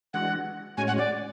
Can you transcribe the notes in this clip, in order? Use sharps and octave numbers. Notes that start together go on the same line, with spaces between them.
E3 G#3 D4 F#4 F#5
A2 G#3 C#4 F#4 C#5 G#5
F#5
D5